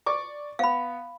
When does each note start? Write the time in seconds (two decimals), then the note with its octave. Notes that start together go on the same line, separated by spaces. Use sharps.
0.06 D5 C#6 D6
0.59 B3 F5 B5